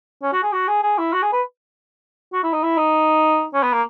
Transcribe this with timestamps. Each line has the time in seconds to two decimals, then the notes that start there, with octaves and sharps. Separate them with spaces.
0.23 C#4
0.33 F#4
0.43 G#4
0.53 F#4
0.68 G#4
0.82 G#4
0.98 E4
1.13 F#4
1.22 G#4
1.33 B4
2.33 F#4
2.43 E4
2.53 D#4
2.63 E4
2.78 D#4
3.54 C#4
3.63 B3
3.73 A#3